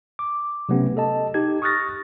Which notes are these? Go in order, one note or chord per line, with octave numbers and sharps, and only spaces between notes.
D6
C3 F#3 A3 B3 C#4 G4
A4 D#5 A5
D#4 G4 G#6
C#6 D#6 F6 F#6 A6 A#6